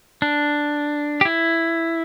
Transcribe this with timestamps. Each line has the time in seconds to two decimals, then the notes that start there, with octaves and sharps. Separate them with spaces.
0.22 D4
1.21 G4
1.25 E4